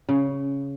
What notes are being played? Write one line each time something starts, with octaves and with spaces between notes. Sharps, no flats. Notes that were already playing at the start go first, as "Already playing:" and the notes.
C#3